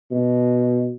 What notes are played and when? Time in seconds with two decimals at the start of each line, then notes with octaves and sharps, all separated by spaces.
0.11 B2